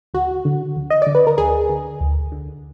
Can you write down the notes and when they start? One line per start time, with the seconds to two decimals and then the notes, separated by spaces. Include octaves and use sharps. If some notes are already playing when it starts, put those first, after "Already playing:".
0.14 D2 F#4
0.45 D3
0.77 D2
0.90 D#5
1.02 D3 D5
1.15 B4
1.27 A#4
1.38 D2 G#4
1.70 D3
2.01 D2
2.32 D3